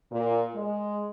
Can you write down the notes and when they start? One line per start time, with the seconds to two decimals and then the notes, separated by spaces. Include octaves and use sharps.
0.11 A#2
0.55 G#3